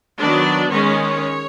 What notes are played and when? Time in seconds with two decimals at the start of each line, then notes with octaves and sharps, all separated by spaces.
0.18 D#3 F#3 B3 D4 D5
0.70 D#3 G#3 C#4 C#5